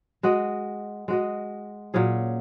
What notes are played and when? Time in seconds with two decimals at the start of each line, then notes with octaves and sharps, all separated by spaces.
0.23 G#3 F#4 D#5
1.08 G#3 F#4 D#5
1.94 A#2 F#3 C#4 G#4